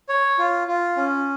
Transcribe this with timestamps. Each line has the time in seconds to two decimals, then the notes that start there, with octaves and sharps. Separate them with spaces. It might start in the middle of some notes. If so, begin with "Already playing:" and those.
0.09 C#5
0.38 F4
0.68 F4
0.96 C#4